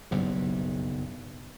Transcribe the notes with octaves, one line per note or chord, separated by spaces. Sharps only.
F#1 B1 G2